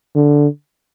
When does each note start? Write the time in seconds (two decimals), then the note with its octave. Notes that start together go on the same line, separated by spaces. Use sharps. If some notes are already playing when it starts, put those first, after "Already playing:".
0.15 D3